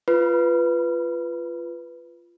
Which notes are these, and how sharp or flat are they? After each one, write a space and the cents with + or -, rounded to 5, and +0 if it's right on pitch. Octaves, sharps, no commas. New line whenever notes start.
F4 -15 B4 +0 B5 -25